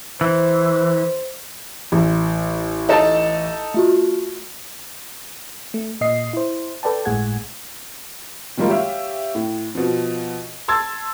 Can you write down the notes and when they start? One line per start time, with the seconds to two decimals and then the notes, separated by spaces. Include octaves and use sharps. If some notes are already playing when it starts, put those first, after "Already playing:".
0.21 E3 C5
1.92 A1
2.89 D#4 A4 A5
3.74 A3 F4 F#4
5.74 A3
6.01 A#2 D#5 C7
6.33 E4 C5
6.83 A4 B4 D5 G5 A5
7.05 G1 A2 G#3 G#4 F#5 G#6
8.57 D#3 F3 G3 G#3 A#3
8.69 G4 C#5 E5 F5
9.35 A2
9.75 B2 F3
10.68 A5 C6 E6 G#6 A6